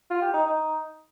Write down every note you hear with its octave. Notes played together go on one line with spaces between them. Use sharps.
F4
G4
D#4
D#4